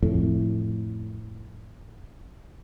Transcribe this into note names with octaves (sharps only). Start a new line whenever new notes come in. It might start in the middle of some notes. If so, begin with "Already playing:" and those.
F2 A2